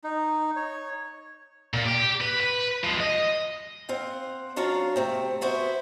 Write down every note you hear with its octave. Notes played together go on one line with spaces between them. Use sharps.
D#4
C#5
A#2
G4
B4
B4
F3 G#3
D#5
C4 F5 F#5
F#3 D4 F4 C#5 F5 A#5
C3 A3 C4
B3 E4 F#4 C5